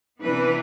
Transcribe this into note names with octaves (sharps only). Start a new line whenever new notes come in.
C3 E3 B3 D4 B4